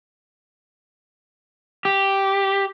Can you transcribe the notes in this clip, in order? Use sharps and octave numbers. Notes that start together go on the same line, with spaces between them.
G4